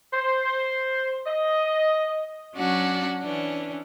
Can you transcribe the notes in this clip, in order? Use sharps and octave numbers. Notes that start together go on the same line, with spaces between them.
C5
D#5
F#3 C#4 D4 F#4 F#5
E3 C#4 D4